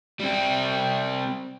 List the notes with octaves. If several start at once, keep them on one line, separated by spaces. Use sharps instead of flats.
G3 C4